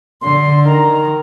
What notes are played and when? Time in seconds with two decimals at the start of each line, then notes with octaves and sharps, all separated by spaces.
0.21 D3 C6
0.65 D#3 A#5